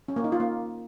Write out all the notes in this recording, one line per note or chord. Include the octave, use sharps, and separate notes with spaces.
C#4
A#3
D#4
F4
A#3